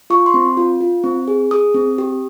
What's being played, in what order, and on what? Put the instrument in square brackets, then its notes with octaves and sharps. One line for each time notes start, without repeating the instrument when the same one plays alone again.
[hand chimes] F4 C#6
C6
C4
F4
F4
C4
G#4
G#4 D#6
C4
G4